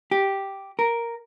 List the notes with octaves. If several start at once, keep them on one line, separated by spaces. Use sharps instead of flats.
G4
A#4